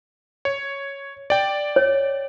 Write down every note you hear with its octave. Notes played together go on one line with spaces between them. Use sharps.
C#5
D5 G5
C#5